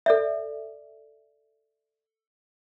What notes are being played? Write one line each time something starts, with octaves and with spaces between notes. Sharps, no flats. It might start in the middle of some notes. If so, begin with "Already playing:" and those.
A4 D5 E5